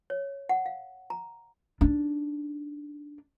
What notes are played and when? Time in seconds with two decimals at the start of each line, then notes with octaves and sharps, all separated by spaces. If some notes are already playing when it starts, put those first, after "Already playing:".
0.10 C#5
0.49 F#5
0.66 F5
1.10 A#5
1.81 D4 D#4